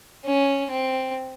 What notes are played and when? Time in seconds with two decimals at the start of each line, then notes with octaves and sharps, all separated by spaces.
0.24 C#4
0.71 C4